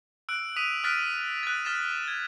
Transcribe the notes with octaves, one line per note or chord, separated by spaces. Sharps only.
E6 F#6 D7
D#6 B6 D#7 F7
D#6 F6 F#6 A6 B6 D7
F#6 A6
F6 A6 B6 E7
G#6